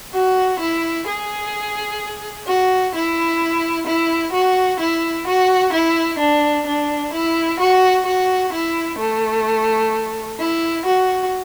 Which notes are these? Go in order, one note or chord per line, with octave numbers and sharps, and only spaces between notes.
F#4
E4
G#4
F#4
E4
E4
F#4
E4
F#4
E4
D4
D4
E4
F#4
F#4
E4
A3
E4
F#4